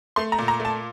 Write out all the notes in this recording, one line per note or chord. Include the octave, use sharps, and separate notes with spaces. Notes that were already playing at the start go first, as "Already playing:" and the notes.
A3 C6
A#5
A#2
A#5
A3
A5